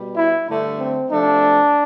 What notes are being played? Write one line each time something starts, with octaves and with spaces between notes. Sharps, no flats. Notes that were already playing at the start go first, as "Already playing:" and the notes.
Already playing: B2 G3
E4
G2 D3 A3
C4
C3 F3 A3 D4